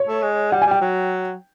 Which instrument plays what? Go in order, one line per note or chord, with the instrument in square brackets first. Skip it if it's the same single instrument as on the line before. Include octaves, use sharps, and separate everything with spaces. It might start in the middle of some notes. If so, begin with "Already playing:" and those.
Already playing: [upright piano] C#5
[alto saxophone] A3
G#3
[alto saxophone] G3 [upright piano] F#5
[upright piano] G#5
[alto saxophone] G3
[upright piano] G5
[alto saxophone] F#3